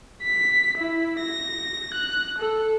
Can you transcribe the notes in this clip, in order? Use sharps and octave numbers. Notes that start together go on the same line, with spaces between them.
B6
E4
A#6
F#6
A4